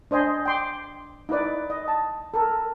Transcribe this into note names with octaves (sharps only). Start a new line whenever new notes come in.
D4 C5 D#5 G#5 C6
G5 C6 D6
D#4 E4 B4 D5
D#5
A5
A4 A#4